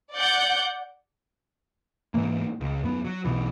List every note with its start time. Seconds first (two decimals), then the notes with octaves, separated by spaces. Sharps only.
0.14 D5 F#5 G6
2.14 G#2 E3 A#3
2.60 C#2
2.83 F#2 B3
3.05 F#3
3.25 B1 B2 E3